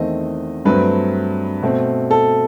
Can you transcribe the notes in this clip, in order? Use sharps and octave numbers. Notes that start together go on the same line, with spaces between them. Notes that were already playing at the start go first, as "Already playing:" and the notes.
Already playing: E2 D#3 A3 C4 D#5
G2 F#3 A3 C4 B4
B2 A3 C4
A4